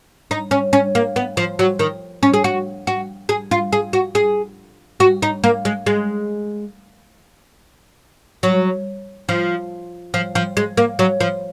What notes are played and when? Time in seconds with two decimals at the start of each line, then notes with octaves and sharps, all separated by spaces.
0.31 D#4
0.51 C#4
0.73 C#4
0.95 A#3
1.16 B3
1.37 F3
1.59 F#3
1.79 D#3
2.23 C#4
2.34 G#4
2.44 F#4
2.87 F#4
3.29 G#4
3.51 F4
3.73 G#4
3.93 F#4
4.15 G#4
5.00 F#4
5.22 D#4
5.44 A#3
5.65 G#3
5.86 G#3
8.43 F#3
9.29 F3
10.14 F3
10.35 F3
10.57 G#3
10.77 A#3
10.99 F#3
11.20 F3